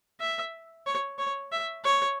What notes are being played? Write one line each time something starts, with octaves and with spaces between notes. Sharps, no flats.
E5
C#5
C#5
E5
C#5